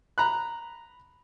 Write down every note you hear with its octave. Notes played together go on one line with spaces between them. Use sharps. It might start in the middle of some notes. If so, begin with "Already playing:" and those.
A#5 B5 F#6